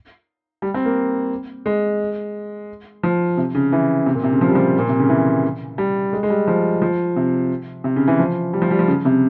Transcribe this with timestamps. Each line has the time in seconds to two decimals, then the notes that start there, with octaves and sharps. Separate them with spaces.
0.62 G3
0.74 C4
0.85 A#3
1.66 G#3
3.03 F3
3.37 C3
3.55 C#3
3.72 E3
4.06 C3
4.15 A#2
4.23 C3
4.32 C#3
4.41 F3
4.49 G3
4.55 F3
4.79 A#2
4.89 C3
4.99 C#3
5.09 E3
5.78 G3
6.13 G#3
6.23 G#3
6.30 G3
6.48 F3
6.82 F3
7.16 C3
7.84 C3
7.96 C#3
8.08 E3
8.19 F3
8.53 G3
8.62 F3
8.71 G3
8.79 F3
8.88 C#3
9.05 C3